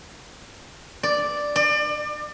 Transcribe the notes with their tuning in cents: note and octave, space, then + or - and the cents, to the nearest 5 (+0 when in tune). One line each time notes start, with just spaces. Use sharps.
D5 +0
D5 +30